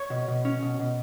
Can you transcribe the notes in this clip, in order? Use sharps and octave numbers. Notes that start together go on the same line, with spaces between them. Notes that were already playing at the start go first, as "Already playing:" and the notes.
Already playing: C#5
B2
B2
C#4
B2
B2